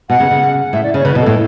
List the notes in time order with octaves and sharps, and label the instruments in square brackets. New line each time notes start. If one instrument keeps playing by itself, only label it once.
[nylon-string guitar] B2 [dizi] F#5
[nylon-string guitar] C#3
C#3
[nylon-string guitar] A2 [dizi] E5
[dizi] D5
[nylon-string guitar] C#3 [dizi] C#5
[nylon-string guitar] C#3 [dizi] B4
[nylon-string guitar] B2
[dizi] A4
[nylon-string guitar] A2